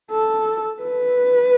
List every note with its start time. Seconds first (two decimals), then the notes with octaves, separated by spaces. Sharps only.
0.11 A4
0.83 B4